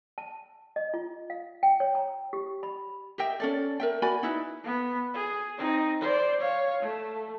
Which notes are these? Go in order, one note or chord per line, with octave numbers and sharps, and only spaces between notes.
A5
D#5
F4
F5
G5
C#5
A#5
G4
B5
G4 D#5 E5 G5
C#4 A4 D5
A#4 E5 G5
F#4 D5 G#5 B5
D#4 E4 B4
B3
G#4
C4 D#4
C5 D5
C#5 F5
A3